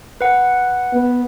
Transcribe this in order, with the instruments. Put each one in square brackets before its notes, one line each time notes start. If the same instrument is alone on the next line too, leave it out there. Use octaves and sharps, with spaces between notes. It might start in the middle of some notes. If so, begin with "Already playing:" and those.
[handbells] B4 F#5
[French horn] B3